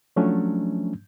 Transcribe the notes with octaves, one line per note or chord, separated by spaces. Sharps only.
F3 F#3 A3 C#4 D4